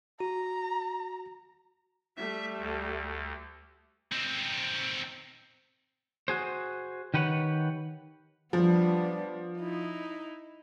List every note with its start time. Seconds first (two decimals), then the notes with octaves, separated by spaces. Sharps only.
0.20 F#4 A#5
2.17 G3 A3 E5
2.58 D2
4.12 C4 D#4
6.28 F#4 G#4 C5
7.14 D#3 G4 B4 C#5 F#5
8.53 F3 G3 B3 D4
9.58 D#4 E4